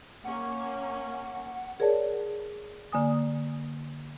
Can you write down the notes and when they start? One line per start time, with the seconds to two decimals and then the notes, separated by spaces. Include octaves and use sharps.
0.24 A#3 C#4 F#5
1.80 G#4 A#4 C#5 D5 A5
2.92 D3 A#3 G#5 D#6